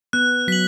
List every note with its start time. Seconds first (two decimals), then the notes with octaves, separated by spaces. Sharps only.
0.13 B3 F#6
0.48 F#3 B6 F#7